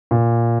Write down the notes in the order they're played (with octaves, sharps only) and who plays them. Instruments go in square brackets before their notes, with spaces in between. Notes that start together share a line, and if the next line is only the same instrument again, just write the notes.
[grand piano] A#2